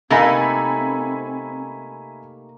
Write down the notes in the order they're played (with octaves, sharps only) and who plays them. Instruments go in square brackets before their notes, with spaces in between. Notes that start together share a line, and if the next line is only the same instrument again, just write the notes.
[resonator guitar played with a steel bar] C3 A3 D#4 [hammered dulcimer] A#3 [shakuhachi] C4 [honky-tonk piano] E5 G#5 B5